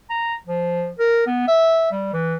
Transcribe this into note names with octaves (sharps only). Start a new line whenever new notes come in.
A#5
F3
A#4
B3
E5
G3
E3